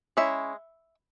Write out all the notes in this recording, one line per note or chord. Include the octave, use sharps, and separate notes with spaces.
G#3 C#4 E4 E5